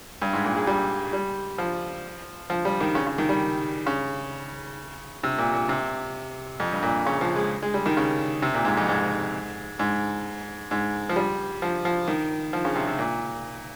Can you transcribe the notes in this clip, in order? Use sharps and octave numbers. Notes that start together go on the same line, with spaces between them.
G2
G#2
A#2
G#3
G3
G3
F3
F3
G3
D#3
C#3
C#3
D#3
G3
C#3
C3
A#2
A#2
C3
F2
G2
A#2
C#3
F3
G#3
G#3
G3
D#3
C#3
C3
A#2
G#2
F2
G#2
G#2
G#2
F3
G3
F3
F3
D#3
F3
C#3
C3
C3
A#2